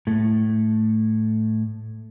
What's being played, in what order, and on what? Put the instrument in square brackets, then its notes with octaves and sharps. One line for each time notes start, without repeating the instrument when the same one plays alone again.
[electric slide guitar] A2 A3